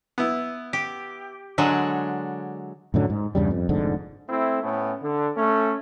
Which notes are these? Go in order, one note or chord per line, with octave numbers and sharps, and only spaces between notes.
B3 E4
G4
D3 F#3 G#3 D4
F#2 A2 D3 F#3
G#2
E2 G2 C#3 G3
F2
F1 G#2 D3
A3 C4 E4
A2 A3 B3 C#4
D3
A3 C#4